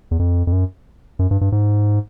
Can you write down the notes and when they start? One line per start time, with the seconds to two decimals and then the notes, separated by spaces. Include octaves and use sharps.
0.11 E2
0.19 F2
0.47 F2
0.52 F#2
1.19 F#2
1.31 G2
1.41 G2
1.52 G#2